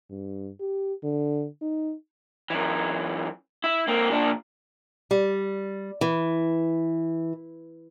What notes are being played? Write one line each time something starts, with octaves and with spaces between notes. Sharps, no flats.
G2
G4
D3
D#4
F#2 E3
E4
A#3 C4
A#2 D4
G3
E3